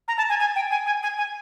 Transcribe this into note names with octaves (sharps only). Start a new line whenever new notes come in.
A#5
A5
G#5
G#5
G5
G#5
G#5
G#5
G#5